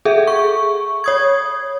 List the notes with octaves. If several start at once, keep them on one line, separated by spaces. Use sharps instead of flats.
G#4 A4 E5
C#6
C#5 D#6 G#6